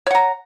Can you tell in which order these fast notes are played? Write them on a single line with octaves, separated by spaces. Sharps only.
C#5 F#5 A#5